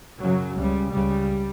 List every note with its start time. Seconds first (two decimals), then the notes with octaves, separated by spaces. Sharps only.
0.21 F#2 C#3 F#3
0.57 C#2 C#3 G3
0.92 C#2 C#3 G3